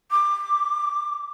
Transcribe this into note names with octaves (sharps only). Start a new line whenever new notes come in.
D6